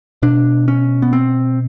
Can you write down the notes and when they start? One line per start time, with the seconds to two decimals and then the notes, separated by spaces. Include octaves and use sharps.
0.23 B2 D4
0.68 C#4
1.02 B3
1.13 C4